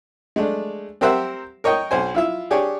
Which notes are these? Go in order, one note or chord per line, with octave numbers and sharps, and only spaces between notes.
G#3 A3 D4
C4 G4 A#4 C5 E5 F#5
A#4 C#5 D#5 G5
B1 C5 G#5
E4 F4 E5
D4 G4 G#4 C#5 D5